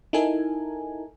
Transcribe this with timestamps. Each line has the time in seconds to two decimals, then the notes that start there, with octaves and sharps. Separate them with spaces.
0.13 D#4 E4 A4 A#4 G#5